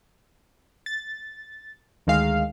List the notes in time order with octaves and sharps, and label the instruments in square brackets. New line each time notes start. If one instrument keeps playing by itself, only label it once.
[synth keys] A6
D2 D#3 G#3 F5